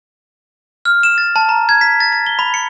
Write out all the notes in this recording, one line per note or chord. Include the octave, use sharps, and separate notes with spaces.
F6
E7
A6
A5
A#5
G#6
B6
A6
A6
G7
B5
C#7